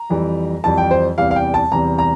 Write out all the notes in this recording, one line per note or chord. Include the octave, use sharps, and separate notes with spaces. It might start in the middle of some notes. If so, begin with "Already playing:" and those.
Already playing: A#5
F2 E3 G3
F2 E3 G3 A5
G5
C5
E2 C3 E3 G3 F5
F5
G5
A5
E2 C3 E3 G3 A#5
A#5